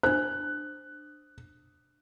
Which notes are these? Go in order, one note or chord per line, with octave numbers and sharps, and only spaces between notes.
D4 C5 F#6